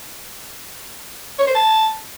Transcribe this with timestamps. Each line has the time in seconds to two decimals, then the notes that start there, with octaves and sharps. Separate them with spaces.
1.39 C#5
1.47 C5
1.55 A5